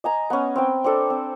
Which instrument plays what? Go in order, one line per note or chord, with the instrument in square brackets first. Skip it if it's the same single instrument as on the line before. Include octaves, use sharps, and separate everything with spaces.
[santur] D#5 G#5 A#5
B3 C#4
C4 G5
C4 D4 A4
C4